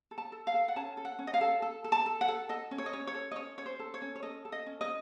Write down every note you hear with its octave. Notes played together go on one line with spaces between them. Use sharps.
A4
A5
A4
F5
A4
F#5
C#4 A5
A4
F#5
C#4
D#5
F5
A4
A4
A4
A5
A4
F#5
A4
A4 D#5
C#4
C#5
D#5
C#4 C#5
C#5
A4
D#5
C#4 C#5
C#4 C#5
C5
A4
C#5
C#4
C#5
A4 D#5
A4
D#5
C#4
D#5